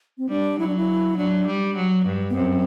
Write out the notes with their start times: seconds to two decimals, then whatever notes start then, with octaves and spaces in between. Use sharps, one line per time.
0.18 C4
0.29 G3 D4
0.59 F#3 E4
0.67 D4
0.76 E4
1.17 F#3 D4
1.47 G3
1.76 F#3
2.05 G2
2.30 B3
2.35 F#2 C4